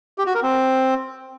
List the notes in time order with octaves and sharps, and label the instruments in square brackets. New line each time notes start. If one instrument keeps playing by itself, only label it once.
[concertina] G4
F#4
A#4
C4